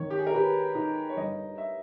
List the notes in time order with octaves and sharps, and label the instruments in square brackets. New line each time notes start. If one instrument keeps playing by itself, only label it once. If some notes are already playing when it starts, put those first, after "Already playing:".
Already playing: [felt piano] D#3 [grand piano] C#5
[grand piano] G4
G#4
A#4
[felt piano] G4 [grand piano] B4
[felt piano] D#4
[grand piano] C#5
[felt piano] G1 [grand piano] D#5
[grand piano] E5